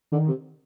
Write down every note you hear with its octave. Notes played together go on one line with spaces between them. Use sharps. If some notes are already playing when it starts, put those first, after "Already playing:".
D3 D#3
C3